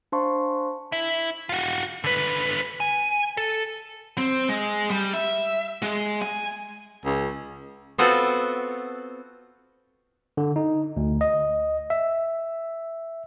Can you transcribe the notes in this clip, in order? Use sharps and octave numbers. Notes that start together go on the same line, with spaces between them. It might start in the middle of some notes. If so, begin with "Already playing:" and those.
D4 C5 F5 A5 C6 C#6
E4
F4 F#4
D3 B4
G#5
A4
C4
G#3
G3
E5
G#3
G#5
C#2
B3 C4 F4 F#4 A4 F#5
D3
D#4
D2
D#5
E5